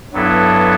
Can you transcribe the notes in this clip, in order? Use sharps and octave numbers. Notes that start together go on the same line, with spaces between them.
G2 F#3 B3 E4 A4